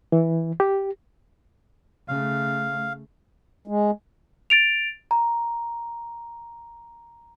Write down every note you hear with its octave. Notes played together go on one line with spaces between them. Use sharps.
E3
G4
C#3 A3 F5
G#3
A6 D7 F7
A#5